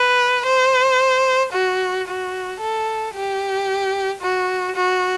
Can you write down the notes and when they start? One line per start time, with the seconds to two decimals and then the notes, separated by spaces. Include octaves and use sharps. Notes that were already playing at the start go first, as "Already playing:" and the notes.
Already playing: B4
0.46 C5
1.53 F#4
2.07 F#4
2.60 A4
3.14 G4
4.21 F#4
4.76 F#4